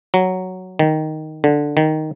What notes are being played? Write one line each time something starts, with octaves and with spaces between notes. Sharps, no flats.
F#3
D#3
D3
D#3